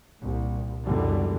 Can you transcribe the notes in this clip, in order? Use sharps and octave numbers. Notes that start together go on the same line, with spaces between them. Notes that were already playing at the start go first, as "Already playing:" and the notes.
C2 A#2
C#2 F#2 B2 D3 E3 G3